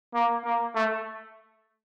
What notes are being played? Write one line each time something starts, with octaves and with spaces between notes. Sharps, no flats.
A#3
A#3
A3